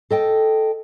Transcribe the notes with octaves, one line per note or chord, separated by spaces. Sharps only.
A4 D#5 G5